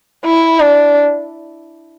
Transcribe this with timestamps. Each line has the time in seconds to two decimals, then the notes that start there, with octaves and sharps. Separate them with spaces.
0.25 E4
0.60 D4